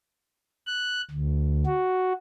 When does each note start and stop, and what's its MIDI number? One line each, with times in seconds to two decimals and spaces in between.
0.67 1.01 90
1.11 1.64 38
1.66 2.13 66